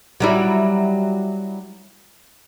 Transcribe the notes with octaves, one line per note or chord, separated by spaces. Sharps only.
F#3 G3 E4